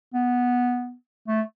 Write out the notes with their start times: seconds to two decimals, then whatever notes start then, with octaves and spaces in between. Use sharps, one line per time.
0.14 B3
1.28 A3